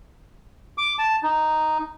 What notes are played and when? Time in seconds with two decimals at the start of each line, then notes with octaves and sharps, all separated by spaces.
0.78 D6
0.99 A5
1.23 D#4